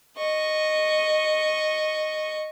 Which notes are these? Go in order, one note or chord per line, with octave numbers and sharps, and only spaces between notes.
D#5 C#6